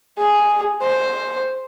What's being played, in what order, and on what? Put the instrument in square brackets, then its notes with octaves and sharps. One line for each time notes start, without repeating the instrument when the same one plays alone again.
[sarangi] G#4
C5